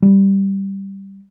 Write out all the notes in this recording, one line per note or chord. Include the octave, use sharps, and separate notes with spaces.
G3